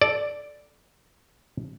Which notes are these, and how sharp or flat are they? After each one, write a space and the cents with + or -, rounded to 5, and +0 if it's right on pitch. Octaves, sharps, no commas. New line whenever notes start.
A4 -15 D5 +0